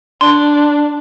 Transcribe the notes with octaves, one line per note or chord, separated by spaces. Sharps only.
D4 C6